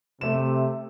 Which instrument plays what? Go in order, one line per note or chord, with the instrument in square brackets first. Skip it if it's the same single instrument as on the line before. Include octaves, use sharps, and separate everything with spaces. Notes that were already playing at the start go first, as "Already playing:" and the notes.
[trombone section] C3 [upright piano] A3 E7